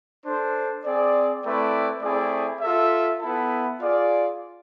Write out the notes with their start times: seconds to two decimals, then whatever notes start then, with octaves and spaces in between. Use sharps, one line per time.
0.24 D4 A4 C5
0.83 C4 G#4 D5
1.43 A3 C4 E4 B4 D5
2.02 A3 C4 E4 G#4 D5
2.60 F4 A4 E5
3.20 B3 E4 A4
3.79 F4 G#4 D5 F5